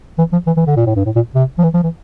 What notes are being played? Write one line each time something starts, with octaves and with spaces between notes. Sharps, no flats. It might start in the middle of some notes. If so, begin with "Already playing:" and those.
E3
F3
E3
E3
D3
A#2
A2
G2
A2
A#2
C3
F3
E3
F3
E3